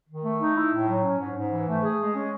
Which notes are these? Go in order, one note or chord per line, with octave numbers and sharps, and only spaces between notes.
D#3
A3
D#4
E4
A2
F#3
C#4
G#2
G#2
E3
A3
G#4
G#3
C#4